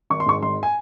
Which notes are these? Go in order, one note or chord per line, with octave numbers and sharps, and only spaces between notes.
G#1 C#6
C6
G#2 C#6
G#1 C6
G#5